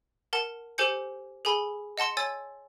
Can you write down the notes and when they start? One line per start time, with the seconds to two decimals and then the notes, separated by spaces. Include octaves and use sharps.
0.33 A#4 F#5 A5
0.78 G4 A4 C5 G#5 G6 C#7
1.45 G#4 A4 G#5 B5
1.98 D#5 F#5 A5 C6 C#7
2.17 C#5 G#5 E6 A6